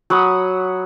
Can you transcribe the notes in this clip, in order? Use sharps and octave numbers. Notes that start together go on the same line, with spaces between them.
F#3 F#5 B5 D#6